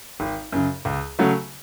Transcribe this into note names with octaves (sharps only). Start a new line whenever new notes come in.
G#1
F#2 C#3
C#2
C#3 F#3 A3